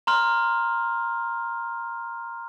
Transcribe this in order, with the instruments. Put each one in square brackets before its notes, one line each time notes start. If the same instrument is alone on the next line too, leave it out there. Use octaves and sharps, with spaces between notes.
[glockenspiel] A#5 C6 F6